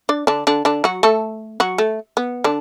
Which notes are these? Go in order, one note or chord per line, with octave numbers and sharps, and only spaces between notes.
D4 D5
D3 D4
D3 D4
D3 D4
F#3 F#4
A3 A4
F#3 F#4
A3
B3
D3 D4